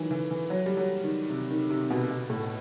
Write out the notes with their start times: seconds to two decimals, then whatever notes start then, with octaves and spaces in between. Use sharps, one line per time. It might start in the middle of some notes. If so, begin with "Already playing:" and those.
Already playing: D#3 E3 F#3
0.11 E3
0.31 E3
0.50 F#3
0.66 G3
0.77 F#3
1.04 D#3
1.30 C3
1.50 D#3
1.70 C3
1.90 B2
2.10 B2
2.30 A2